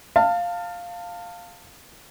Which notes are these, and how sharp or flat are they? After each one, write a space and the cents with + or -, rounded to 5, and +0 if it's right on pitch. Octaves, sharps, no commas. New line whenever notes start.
F5 +0 A5 +30